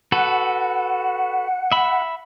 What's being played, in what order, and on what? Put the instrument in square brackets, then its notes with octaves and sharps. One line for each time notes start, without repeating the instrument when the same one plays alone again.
[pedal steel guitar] F#4 A4 B4 [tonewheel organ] F#5
[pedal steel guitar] E5 B5